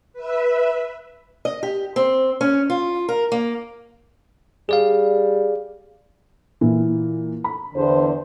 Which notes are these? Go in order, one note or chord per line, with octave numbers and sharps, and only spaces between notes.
B4 E5
D#5
G4
C4
C#4
F4
A#4
A#3
G3 G#4 D5 F5
A#2 E3
B5
E2 D3 C5